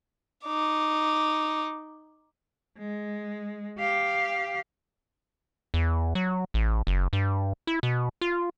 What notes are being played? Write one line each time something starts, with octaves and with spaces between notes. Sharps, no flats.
D#4 D6
G#3
G4 F5
E2
F#3
A1
F#1
G2
E4
B2
F4